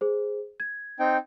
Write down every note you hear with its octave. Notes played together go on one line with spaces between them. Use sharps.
G#4 C5
G#6
C4 D#4 G5